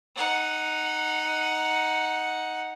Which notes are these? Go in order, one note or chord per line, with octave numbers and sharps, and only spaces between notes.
D#4 F#5